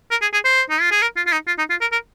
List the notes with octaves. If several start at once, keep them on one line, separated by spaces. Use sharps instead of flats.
A#4
G#4
G#4
C5
D#4
F4
G#4
A#4
F4
F4
D#4
F4
D#4
F4
A#4
A#4